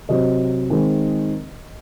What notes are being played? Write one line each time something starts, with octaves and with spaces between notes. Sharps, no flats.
C3 F#3 C4 D#5
D#3 G#3 C4